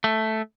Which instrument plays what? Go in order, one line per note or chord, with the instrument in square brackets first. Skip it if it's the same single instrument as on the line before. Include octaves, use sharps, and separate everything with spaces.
[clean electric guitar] A3